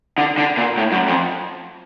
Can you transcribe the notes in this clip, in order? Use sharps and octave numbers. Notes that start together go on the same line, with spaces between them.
D3
D3
A#2
A2
F#2
F2